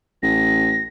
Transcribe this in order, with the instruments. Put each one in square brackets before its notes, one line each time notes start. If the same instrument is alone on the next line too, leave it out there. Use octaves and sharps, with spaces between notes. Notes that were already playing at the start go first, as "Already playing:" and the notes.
[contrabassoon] A1 [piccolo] A#6